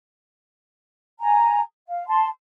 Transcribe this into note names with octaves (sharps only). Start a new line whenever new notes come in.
G#5 A#5
F5
A5 C6